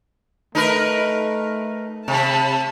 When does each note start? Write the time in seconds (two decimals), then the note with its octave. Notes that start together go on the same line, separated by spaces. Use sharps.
0.55 A3 D#4 A#4 B4
2.08 C3 A5 B5